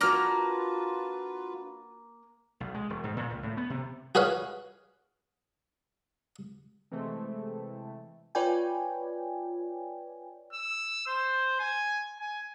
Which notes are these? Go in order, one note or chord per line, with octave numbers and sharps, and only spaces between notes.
A#3 D4 F4 F#4 B4 A#5 F6
B1
G#3
E1
G#2
A#2
C#2
A2
B3
C3
F#4 G#4 B4 C#5 F5
C3 E3 G#3 A3 C4
F4 B4 C#5 D5 G5 G#5
E6
C5
G#5
G#5